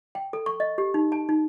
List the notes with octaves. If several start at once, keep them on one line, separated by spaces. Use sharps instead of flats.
G5
A4
C#6
D#5
G4
D#4
A5
D#4